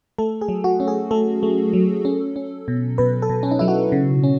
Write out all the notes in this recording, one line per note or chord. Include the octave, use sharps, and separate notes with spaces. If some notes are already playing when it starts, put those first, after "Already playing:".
A3 A4
G#4
F#3
F#4
C#4
G#4
A3 A4
A3
F#3
C#4
C#4
B2
B2 B4
A4
B2
C#4
D#4
F#3 E4
F#4
C#3
C#4